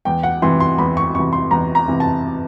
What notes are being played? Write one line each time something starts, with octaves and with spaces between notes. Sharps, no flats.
E2 G5
F#5
C3 E3 C6
C6
E2 B5
C#6
C3 E3 C#6
C6
E2 A#5
A#5
C3 E3
A5